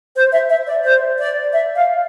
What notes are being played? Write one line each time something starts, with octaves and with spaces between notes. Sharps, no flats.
C5
E5
E5
D5
C5
D5
E5
F5